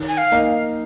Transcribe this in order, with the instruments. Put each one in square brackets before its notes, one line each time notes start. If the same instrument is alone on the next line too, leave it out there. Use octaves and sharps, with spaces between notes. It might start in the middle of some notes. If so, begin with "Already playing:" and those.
Already playing: [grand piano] D#3
[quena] G#5
F5
[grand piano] A#3 D#4